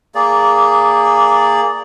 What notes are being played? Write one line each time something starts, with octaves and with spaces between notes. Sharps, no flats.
A#3 G#4 D5